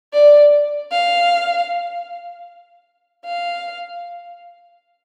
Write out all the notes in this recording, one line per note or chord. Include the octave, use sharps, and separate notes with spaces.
D5
F5
F5